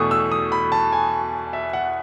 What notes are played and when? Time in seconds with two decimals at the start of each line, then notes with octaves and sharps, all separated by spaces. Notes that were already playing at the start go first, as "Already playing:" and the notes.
Already playing: E2 B2 A3 C#6 D#6
0.11 E6
0.32 D#6
0.52 B5
0.72 A5
0.92 G#5
1.53 E5
1.73 F#5